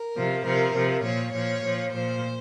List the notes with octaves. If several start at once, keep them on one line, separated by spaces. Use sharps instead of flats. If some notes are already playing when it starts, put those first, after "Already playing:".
Already playing: A#4
C3 F3
C3 F3 A#4
C3 F3
A#2 F3 C#5
A#2 F3 C#5
A#2 F3
A#2 F3 C5